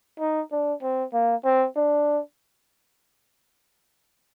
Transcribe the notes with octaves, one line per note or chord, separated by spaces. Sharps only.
D#4
D4
C4
A#3
C4
D4